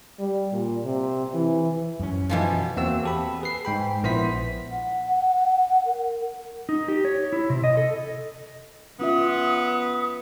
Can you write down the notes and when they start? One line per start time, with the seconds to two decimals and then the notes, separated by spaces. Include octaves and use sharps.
0.19 G3
0.52 A#2
0.85 C3
1.34 E3
2.00 F#2 C#4
2.29 B2 E3 F3
2.76 E2 A#3 C4 F#4 E6
3.03 G4 A4 B5
3.41 G#4 B4 C7
3.65 G#2 G5 B5
4.03 A#1 B3 E4 C5 B6
4.72 F#5
5.86 A#4
6.69 D#4
6.88 G4
7.05 C#5
7.33 E4
7.50 C3
7.64 D#5
7.77 A4
9.00 B3 C#4 F4 E5 D#6